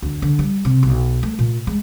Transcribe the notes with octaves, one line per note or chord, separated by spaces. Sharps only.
D2
D3
G3
C3
B1
A3
A#2
G#3